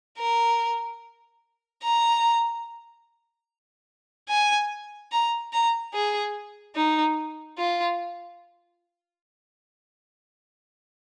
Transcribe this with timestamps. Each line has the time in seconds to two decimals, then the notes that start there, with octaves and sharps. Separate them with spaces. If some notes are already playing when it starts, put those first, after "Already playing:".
0.19 A#4
1.83 A#5
4.29 G#5
5.12 A#5
5.53 A#5
5.94 G#4
6.76 D#4
7.58 F4